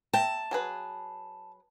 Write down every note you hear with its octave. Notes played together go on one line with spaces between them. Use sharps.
E5 G5 A5 A#5
F#3 G#4 B4